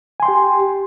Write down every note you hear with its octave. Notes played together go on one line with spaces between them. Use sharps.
G4 G5 G#5 C6